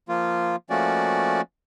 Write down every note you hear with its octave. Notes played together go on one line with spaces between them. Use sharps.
F3 A#3 F4
F3 A3 A#3 C#4 F#4 D5